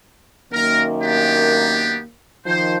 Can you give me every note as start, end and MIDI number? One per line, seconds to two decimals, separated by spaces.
0.53 2.07 42
0.53 2.07 51
0.53 2.07 58
0.53 0.83 70
1.02 1.98 59
1.02 1.98 62
1.02 1.98 67
2.46 2.78 51
2.46 2.78 53
2.46 2.75 72